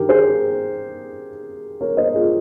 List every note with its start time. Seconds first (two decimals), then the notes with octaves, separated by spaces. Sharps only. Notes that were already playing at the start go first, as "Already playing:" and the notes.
Already playing: G2 D#3 G4 A#4
0.09 G#4 C5
1.81 A#4 C#5
1.97 C5 D#5
2.15 F4 G#4